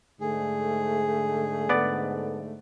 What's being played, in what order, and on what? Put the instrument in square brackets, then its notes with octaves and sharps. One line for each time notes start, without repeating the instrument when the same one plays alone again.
[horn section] G#2 D3 [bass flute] A3 [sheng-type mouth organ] G#4
[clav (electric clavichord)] B3 D5